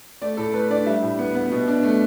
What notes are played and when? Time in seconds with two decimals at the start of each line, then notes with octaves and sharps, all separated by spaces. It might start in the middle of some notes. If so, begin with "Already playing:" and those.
0.22 A3 D5
0.37 A2 A4
0.53 A3 B4
0.70 D4 D5
0.86 G3 E5
1.03 A2
1.19 B3
1.35 B3
1.52 B2
1.68 D4
1.83 A3